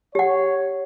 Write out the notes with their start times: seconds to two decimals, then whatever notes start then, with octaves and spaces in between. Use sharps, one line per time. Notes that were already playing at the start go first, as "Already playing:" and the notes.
0.15 G4 C#5 F#5